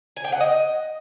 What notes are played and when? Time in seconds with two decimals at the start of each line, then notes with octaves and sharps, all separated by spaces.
0.17 G#5
0.24 G5
0.32 F#5
0.40 D#5